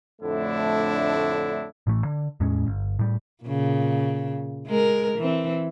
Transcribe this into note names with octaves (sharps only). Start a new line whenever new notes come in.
F2 A2 D3 A3 D4 E4
A1 A2 E3 A3
D3
E2 A2 G#3 C#4
G1
A2 G3
A#2 C#3
G#3 A#4
E3 C4